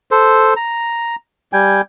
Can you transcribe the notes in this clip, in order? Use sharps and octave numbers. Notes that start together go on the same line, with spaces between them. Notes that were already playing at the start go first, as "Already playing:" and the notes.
A4 C5
A#5
G3 G5 G#5